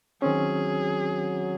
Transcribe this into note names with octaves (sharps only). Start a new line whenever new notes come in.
D#3 F#3 C4 C#4 G#4